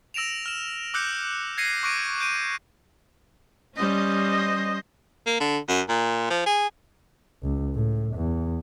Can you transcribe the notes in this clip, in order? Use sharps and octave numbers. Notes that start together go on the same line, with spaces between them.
E6 A#6 D7 E7 F7
F6 E7
D6 E6 F#6 G6 C#7
G#6 A#6 C7 C#7 D#7
C#6 D6 F#6 A#6 D7 D#7
G6 D7 D#7
G3 C#4 C5 D#5
A#3
D3
F#2
A#2
F3
G#4
C#2
A2
E2